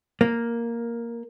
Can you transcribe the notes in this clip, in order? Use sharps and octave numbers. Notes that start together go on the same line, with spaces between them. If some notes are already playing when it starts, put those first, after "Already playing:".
A#3